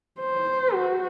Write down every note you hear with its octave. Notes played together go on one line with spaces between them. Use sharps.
C5
F#4